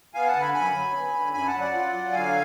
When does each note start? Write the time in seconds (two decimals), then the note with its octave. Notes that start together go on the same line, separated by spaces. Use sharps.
0.14 B3 F5 G#5
0.28 F#5 A5
0.34 D3
0.41 G#5 B5
0.54 F#2 G#5 B5
0.74 F#3
0.94 B3
1.14 D3
1.33 F#2 G#5 B5
1.47 F#5 A5
1.53 F#3
1.60 D5 F#5
1.73 F4
1.93 F#3
2.12 D3 F5 G#5